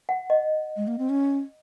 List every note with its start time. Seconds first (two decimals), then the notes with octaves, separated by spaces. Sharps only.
0.09 F#5
0.30 D#5
0.77 G#3
0.87 A#3
0.99 C4
1.10 C#4